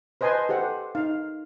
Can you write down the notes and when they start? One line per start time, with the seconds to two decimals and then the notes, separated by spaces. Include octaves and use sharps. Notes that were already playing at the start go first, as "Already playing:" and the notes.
0.21 B4 C5 D#5 G#5 A5 C6
0.49 G4 A4 C5 F#5
0.95 D#4 F5